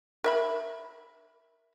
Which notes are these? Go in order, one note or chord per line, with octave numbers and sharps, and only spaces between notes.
A#4 E5 B5